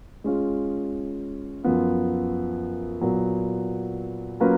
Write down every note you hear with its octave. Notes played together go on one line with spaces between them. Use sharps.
G#3 C#4 F4
F#2 F3 B3 F4
A#2 F#3 B3
F#3 A#3 C#4 F4 B4